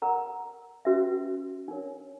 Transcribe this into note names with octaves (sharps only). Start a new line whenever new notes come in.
A#4 D5 F#5 A#5
C#4 F#4 B4 E5
D4 A#4 C#5